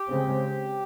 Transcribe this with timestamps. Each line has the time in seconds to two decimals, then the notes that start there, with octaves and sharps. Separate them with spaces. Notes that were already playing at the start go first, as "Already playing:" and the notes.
Already playing: G4
0.09 C#3 G#3 C4